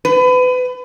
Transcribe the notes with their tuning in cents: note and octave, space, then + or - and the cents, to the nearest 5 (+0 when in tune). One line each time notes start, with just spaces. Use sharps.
B4 +30